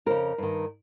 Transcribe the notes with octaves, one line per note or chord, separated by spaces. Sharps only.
F2 C#3 A#4
G2 D#3